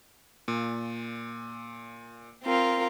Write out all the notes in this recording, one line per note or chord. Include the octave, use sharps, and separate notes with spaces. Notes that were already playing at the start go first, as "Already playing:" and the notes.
A#2
C4 F4 A#4